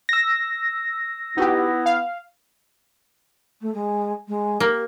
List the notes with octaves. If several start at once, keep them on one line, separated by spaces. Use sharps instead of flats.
E6 A#6
B3 D#4 E4 F#4 G4
F5
A3
G#3
G#3
A#3 G4